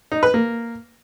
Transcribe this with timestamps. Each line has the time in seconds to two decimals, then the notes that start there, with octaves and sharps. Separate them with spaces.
0.12 D#4
0.23 B4
0.34 A#3